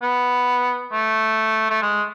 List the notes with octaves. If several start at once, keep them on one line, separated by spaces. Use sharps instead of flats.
B3
A3
A3
G#3